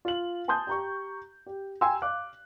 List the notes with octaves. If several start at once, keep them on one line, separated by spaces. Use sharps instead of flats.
F4 F#7
G#5 A5 C6 D#6 G6
G4 A#5 C#6
G4
G5 G#5 A#5 C6 E6
F5 D6 F#6